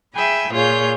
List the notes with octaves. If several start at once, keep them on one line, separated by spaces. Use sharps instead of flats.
G#4 E5 G5 G#5 B5
A#2 F4 G#4 C#5 G6